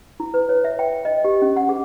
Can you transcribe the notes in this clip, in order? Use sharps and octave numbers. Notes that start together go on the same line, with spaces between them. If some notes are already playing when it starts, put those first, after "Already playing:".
E4
B4
C#5
E5
G5
D#5
G4
C#4
F#5
G#4